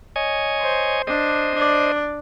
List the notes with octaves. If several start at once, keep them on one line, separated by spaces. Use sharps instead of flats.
C#5 D#5 G#5
C5
D4 C5 D#5
D4 D5